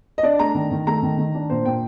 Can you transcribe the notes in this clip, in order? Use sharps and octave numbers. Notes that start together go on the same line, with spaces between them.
D#5
D4 D5
A3 A#5
D#3
D#3
A3 A#5
D#3
D#3
D4
A#2 C5
A#2 G5